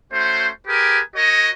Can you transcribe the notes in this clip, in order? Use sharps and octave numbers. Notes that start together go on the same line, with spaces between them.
A3 C#4 F#4 C5
G4 G#4 A#4 B4 G#5
F#4 A#4 C#5 D#5